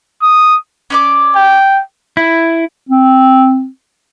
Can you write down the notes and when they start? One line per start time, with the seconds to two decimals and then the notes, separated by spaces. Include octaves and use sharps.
0.22 D#6
0.90 C#4 D5 D6
1.35 G5
2.17 E4
2.89 C4